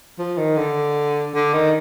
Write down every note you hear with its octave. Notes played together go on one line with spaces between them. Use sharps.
F3
D#3
D3
D3
D#3